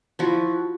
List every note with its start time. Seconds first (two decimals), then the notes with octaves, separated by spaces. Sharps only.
0.19 F3 E4 F#4